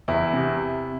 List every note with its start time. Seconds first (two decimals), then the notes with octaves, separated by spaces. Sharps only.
0.08 E2 E4
0.33 C3